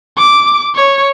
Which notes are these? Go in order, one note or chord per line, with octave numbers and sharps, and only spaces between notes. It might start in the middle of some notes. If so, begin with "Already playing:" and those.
D6
C#5